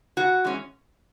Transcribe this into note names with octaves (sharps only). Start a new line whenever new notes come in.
C#3 F#4
E3 G#3 C#4